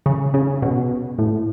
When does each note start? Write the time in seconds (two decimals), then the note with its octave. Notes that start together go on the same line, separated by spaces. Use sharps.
0.06 C#3
0.34 C#3
0.62 B2
1.19 A2